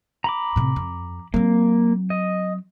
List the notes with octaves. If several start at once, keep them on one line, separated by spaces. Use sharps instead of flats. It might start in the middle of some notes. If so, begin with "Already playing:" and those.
A#5 B5 D6
A2 C3
F2
F#3 A#3 C4
D#5